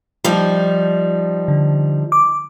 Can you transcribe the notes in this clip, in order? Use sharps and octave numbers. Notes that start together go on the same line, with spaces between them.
F3 G3 D#4
D3
D6